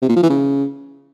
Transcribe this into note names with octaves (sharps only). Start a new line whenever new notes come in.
C3
A#2
F3
E3
C#3